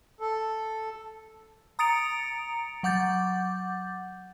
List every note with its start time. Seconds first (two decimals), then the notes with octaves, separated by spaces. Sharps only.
0.20 A4
1.79 A#5 D#6 A6 C#7 D7 F7
2.83 F#3 F#5 D6 G6 A6